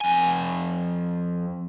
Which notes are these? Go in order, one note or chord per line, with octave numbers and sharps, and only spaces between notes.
F2 G#5